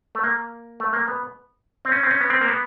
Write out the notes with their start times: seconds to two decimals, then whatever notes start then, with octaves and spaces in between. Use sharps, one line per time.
0.15 A3
0.23 A#3
0.80 A3
0.93 A#3
1.08 B3
1.85 C4
1.92 C#4
2.03 C4
2.11 C#4
2.21 B3
2.30 C4
2.41 A#3
2.48 B3